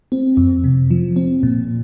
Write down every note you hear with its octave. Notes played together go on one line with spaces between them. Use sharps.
C4
F2
C3
F3
C4
A#2